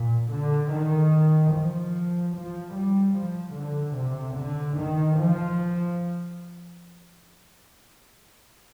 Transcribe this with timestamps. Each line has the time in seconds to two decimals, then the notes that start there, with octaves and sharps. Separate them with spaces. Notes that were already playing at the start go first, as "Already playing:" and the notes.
Already playing: A#2
0.33 D3
0.73 D#3
1.54 F3
2.36 F3
2.76 G3
3.17 F3
3.57 D3
3.98 C3
4.39 D3
4.79 D#3
5.20 F3